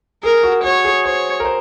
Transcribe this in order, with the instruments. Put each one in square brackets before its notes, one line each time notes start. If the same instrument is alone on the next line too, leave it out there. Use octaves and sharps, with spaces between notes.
[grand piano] G#4 [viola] A#4
[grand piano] F#4
[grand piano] F#4 [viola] C#5
[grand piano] G#4
[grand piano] C5 [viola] C#5
[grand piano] A#4
C5